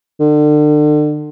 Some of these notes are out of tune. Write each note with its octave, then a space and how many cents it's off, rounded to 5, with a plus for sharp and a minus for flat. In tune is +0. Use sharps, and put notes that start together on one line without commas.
D3 +35